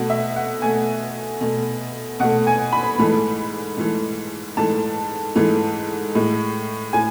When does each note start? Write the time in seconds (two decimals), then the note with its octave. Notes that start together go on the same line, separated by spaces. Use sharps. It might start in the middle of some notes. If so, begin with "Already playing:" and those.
Already playing: B2 A3 F#4
0.10 E5
0.36 F#5
0.62 B2 A3 G#5
1.41 B2 A3
2.20 B2 A3 F#5
2.47 G#5
2.72 B5
2.98 G#2 E3 A3
3.78 G#2 E3 A3
4.57 G#2 E3 A3 A5
5.35 G#2 E3 A3
6.15 A2 G#3
6.93 A2 G#5